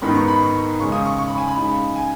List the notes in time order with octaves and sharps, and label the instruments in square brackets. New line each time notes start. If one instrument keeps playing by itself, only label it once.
[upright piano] G#2 D#3 B3 D#4 [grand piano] B5
[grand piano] C#6
B5
C#6
[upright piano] C#3 G#3 C#4 [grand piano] C#6
[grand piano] D#6
C#6
C#6
B5
G#5
B5
[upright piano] C#3 G#3 D#4
[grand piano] G#5